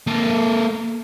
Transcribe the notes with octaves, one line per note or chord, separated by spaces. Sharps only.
A#3 A4